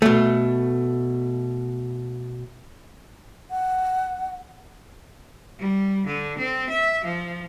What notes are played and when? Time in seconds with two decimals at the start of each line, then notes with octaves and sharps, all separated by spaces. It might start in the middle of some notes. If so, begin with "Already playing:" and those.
0.02 B2 A3
3.51 F#5
5.59 G3
6.06 D3
6.38 C4
6.70 E5
7.04 F3